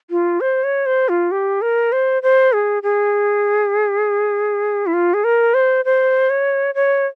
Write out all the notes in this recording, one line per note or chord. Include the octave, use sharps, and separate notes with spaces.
F4
C5
C#5
C5
F4
G4
A#4
C5
C5
G#4
G#4
E4
F4
G#4
A#4
C5
C5
C#5
C#5